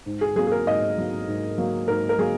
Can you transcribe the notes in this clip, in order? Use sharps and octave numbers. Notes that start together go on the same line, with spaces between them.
G#2
G#4
F#3 A#3 G#4
G#4
A#4
G#2 D#5
F#3 A#3
G#2
F#3 A#3
G#2 A#4
A#4
F#3 A#3 G#4